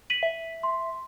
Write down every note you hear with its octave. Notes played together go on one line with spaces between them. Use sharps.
B6 D#7 F#7
E5
C6